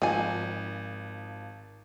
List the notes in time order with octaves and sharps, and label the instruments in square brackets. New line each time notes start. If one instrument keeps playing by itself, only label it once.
[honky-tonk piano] G#1 F3 [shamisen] D#3 G#5